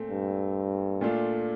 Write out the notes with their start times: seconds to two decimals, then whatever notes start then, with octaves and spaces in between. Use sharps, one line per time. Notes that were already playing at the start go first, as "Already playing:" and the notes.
Already playing: A#2 A3 C4
0.11 G2
1.01 A#2 A3 D4 F4